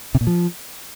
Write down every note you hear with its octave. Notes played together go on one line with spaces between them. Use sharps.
C3
A#2
F3